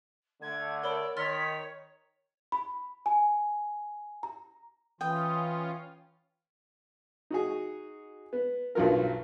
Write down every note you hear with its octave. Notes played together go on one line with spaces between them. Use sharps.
D3 A3 G#6
A#4 C#5 D5 B5 E6
D#3 C#5 C6 F6 A6 B6
B5
G#5
A#5
E3 C#4 F4 G5 D#6
D#4 F#4 G#4
B3
B1 G2 F#3 F4 A#4